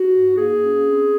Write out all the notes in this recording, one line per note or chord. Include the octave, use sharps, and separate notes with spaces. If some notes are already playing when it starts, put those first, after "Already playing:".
Already playing: F#4
G#2
A#3 G#4
C#4
C4